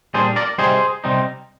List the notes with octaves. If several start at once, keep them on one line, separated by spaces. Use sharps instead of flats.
A#2 G3 D4 G#4 C5
A#4 D5
C3 G3 C4 D#4 G#4 C5
C3 G3 C4 D#4